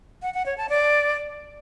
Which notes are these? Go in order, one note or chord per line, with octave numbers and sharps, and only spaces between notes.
F#5
F#5
C#5
A5
D5